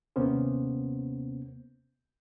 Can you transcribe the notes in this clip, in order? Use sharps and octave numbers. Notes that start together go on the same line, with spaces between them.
D#2 C3 A#3 B3 C#4 C5